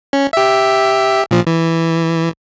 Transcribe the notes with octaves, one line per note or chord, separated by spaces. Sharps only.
C#4
G4 E5
A#2 F3
E3